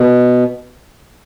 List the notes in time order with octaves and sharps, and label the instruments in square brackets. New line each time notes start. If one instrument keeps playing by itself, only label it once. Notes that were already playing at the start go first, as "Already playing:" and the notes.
Already playing: [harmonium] B2